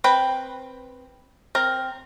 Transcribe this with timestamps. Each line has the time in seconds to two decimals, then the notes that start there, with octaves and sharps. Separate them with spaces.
0.04 C4 B4 G5 B5
1.55 C4 A#4